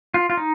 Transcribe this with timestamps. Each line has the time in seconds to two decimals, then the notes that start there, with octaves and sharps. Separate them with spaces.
0.14 F4
0.30 F4
0.37 D#4